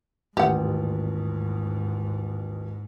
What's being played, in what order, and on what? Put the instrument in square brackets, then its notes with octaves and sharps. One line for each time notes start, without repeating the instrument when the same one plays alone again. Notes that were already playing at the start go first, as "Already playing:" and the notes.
[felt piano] D#1 A1 [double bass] G#2 [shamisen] G4 F#5